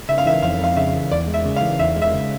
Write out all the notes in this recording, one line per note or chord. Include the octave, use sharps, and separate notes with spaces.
C#3 E5
F5
E3 E5
F2 F5
F2 F5
C#3 E5
E3
E2 D5
G#3
E5
C#3
F5
E3
E2 E5
G#3
E5
C#3